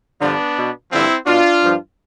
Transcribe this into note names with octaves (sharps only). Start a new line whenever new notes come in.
G2 D3 F3 B3 D4
B2
G2 D3 F3 C4 E4
B2 D4 F4
G2 F3